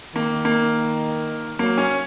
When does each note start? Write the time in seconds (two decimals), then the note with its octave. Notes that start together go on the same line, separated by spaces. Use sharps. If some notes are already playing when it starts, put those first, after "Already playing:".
0.16 D#3 A#3
0.45 A#3
1.59 F#3 A#3
1.78 C#4